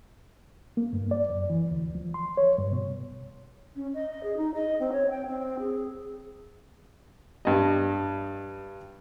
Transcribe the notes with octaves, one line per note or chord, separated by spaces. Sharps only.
A#3
G2
D5
F#2
E3
D2
F3
C6
C#5
G2
B2
C#4
D#5
D#5
G#4
D#4
D#5
C4
C#5
G5
C4
G#4
G2 D#5